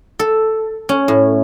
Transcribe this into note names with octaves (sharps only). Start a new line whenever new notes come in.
A4
C#4
A2